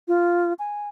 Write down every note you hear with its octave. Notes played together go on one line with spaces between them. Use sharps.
F4
G#5